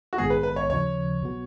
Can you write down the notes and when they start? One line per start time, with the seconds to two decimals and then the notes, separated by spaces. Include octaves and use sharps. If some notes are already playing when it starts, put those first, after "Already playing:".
0.13 F#4
0.18 A#1 G#2 D#3 G#3 B3 G#4
0.30 B4
0.43 B4
0.56 C#5
0.69 D#2 C#3 F3 C#5
1.21 B1 B2 F#3 B3 F#4